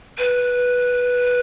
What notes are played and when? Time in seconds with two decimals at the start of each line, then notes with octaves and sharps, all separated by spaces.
0.18 B4